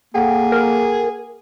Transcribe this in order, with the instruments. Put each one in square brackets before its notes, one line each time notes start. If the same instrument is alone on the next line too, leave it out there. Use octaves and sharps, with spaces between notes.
[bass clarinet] A#3 [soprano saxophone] G#4 [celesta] A4 F#5 G5
[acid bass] A#4